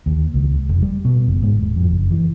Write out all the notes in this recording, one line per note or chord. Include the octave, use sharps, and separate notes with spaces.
D#2
C#2
F1
G3
B2
F#1
G#2
D#1
F2
F#1
E3